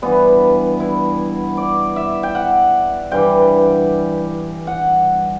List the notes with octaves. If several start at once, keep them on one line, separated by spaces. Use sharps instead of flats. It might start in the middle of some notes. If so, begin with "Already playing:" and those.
G2 E3 G3 B3
E4
D5
E5
G5
F#5
G2 E3 G3 G5
F#5